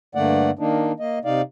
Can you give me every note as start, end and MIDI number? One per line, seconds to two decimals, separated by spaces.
0.15 0.51 43
0.15 0.51 50
0.15 0.51 57
0.15 0.51 58
0.15 0.51 74
0.15 0.51 78
0.59 0.92 51
0.59 0.92 58
0.59 0.92 62
0.59 0.92 63
1.00 1.19 58
1.00 1.19 75
1.25 1.42 48
1.25 1.42 63
1.25 1.42 74
1.25 1.42 77